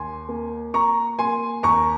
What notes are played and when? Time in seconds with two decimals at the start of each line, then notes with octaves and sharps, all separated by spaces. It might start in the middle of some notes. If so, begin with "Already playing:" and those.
Already playing: D#2 G#5 C6
0.29 A#3
0.74 A#3 A#5 C#6
1.19 A#3 G#5 C6
1.63 D#2 A#5 C#6